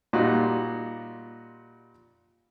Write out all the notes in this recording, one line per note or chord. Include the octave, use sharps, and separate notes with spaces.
A#2 G3 D#4 F4 F#4